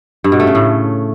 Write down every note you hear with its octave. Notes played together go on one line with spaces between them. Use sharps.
G2
B2
A3
C#3
A2